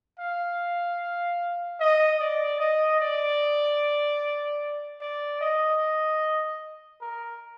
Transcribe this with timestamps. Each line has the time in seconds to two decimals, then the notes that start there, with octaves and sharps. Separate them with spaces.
0.19 F5
1.80 D#5
2.20 D5
2.60 D#5
3.00 D5
5.01 D5
5.41 D#5
7.01 A#4